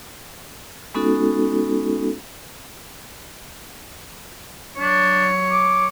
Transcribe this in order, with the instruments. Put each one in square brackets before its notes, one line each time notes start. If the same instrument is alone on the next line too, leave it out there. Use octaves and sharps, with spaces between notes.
[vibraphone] G#3 B3 C#4 D#4 F#4 A4
[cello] F#3 C#5 [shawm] D4
[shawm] D6